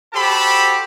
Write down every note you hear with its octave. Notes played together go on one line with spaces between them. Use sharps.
F#4 G4 A4 C5 A5 B5